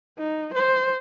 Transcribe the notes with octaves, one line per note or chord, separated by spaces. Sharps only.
D#4
C5